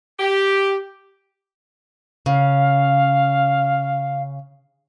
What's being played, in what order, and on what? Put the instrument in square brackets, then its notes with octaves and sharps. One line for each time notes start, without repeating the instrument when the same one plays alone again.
[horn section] G4
[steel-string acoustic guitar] C#3 [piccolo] F5